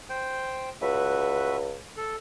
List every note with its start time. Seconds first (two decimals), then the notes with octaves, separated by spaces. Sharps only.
0.09 C5 G5
0.82 C#2 F#4 B4 E5
1.97 A4